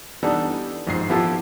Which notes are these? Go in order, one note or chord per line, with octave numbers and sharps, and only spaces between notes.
E3 G3 B3 D4 D#4 A4
A#1 G#2 C7
F3 B3 E4 F4 G4 A4